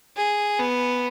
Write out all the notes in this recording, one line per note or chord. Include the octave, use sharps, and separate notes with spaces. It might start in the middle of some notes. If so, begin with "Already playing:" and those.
G#4
B3